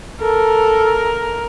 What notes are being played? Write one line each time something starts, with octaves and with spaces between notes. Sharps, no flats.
A4 A#4